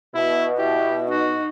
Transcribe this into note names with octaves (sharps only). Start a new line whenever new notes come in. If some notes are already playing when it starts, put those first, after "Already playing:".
B2 E4
E4 G4
D#4 F#4